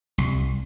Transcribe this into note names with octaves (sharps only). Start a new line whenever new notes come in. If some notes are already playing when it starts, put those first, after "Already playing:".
C2